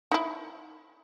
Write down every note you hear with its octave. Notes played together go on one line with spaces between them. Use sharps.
D#4 E4